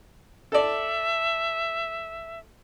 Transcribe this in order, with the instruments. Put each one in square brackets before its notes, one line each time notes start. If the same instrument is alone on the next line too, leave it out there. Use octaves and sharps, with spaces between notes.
[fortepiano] A4 D5 [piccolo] E5